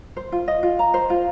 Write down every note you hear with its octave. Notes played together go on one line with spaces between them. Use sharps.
C5
F4
D#5
F4
A#5
C5
F4